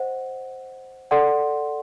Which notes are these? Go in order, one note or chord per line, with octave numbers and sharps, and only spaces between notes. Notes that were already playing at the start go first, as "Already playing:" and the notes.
Already playing: C5 D#5 F#5
A4 D5 F#5 C6